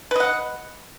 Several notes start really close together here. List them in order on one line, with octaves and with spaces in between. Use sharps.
B4 D#5 F#5